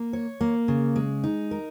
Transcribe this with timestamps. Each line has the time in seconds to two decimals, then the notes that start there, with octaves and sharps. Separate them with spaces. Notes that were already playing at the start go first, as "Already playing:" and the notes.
Already playing: A#3
0.13 C#5
0.41 A#3
0.68 C#3
0.96 G#3
1.24 D#4
1.51 A#4